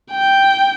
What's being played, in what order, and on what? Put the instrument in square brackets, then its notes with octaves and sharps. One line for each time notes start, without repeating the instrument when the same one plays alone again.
[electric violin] G5